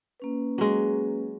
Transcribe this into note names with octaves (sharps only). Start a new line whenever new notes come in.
A#3 C#4 B4
F#3 G#3